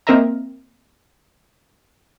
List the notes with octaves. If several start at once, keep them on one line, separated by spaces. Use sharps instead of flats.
A#3 C4 A#4 D#5 E5 A#5